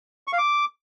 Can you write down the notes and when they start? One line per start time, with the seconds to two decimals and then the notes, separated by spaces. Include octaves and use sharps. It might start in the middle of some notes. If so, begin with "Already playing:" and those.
0.27 C#6
0.33 F5
0.38 D6